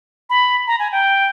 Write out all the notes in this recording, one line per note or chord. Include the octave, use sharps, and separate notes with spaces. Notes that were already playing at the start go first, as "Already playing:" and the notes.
B5
A#5
G#5
G5